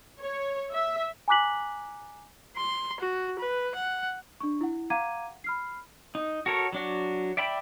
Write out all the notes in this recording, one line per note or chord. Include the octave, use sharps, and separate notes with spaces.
C#5
E5
G#5 A#5 D6 F#6 B6 F#7
C6
F#4
B4
F#5
D4 C#6
E4 F#5
F5 F#5 A#5 D6 G#6 D#7
B5 F6 C7
D#4
F#4 A4 A#4 C#5
F#3 D4 F#4
D5 E5 G5 B5